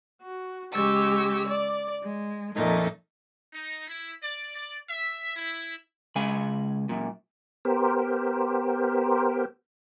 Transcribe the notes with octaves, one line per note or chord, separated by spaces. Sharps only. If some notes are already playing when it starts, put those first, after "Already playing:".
F#4
C#3 G#3 G4 C#6 E6
D5
G#3
F2 A#2 A3 D#4
D#4
E4
D5
D5
E5
E4
C#3 G#3 G#5 B5
F#2 A#2
B3 G4 A#4 C5